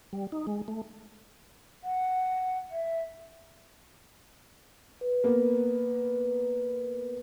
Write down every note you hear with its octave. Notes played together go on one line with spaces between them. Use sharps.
G3
D#4
G#3
A3
F#5
E5
B4
A#3 B3